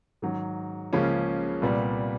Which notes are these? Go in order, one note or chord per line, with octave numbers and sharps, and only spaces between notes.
G#2 D#3 F#3
C#2 C#3 F3 A#3 C#4
C2 A#2 G3 B3